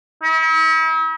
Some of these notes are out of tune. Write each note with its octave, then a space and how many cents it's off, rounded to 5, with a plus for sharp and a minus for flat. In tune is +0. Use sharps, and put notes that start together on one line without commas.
E4 -45